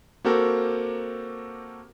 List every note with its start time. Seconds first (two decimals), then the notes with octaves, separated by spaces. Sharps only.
0.25 A#3 C4 F#4 G4 A4 A#4